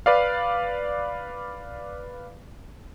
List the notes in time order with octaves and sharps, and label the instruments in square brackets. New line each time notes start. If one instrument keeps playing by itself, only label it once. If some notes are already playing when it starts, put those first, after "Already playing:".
[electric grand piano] B4 D5 F5